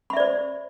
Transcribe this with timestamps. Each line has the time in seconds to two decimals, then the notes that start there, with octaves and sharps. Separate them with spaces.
0.10 B5
0.13 E5
0.17 D5
0.20 C5